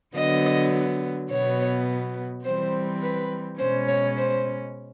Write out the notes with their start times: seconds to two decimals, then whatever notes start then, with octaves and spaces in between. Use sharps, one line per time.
0.16 D3 F#3 B3 D#5
1.31 B2 F#3 B3 C#5
2.45 E3 G3 C4 C5
3.03 B4
3.59 B2 G#3 C#4 C5
3.89 C#5
4.17 C5